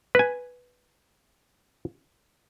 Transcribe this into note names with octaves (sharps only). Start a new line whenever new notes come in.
B4 G#5